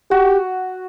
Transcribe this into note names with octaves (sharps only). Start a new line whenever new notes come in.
F#4 G4